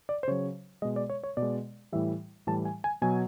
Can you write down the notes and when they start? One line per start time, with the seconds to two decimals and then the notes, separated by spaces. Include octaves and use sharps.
0.09 D5
0.23 C5
0.28 C#3 F#3 C#5
0.82 B2 G#3 D#5
0.96 D5
1.10 C#5
1.24 C#5
1.37 B2 D5
1.42 G#3
1.92 A2 E3 G3 E5
2.47 A2 E3 G3 A5
2.65 G#5
2.84 G#5
3.02 B2 F#3 G#5